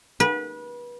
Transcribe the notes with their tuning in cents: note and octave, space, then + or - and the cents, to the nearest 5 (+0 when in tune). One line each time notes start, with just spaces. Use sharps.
B4 -30